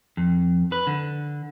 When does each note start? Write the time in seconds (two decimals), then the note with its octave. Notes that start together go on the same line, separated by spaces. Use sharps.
0.17 F2
0.72 B4
0.87 D3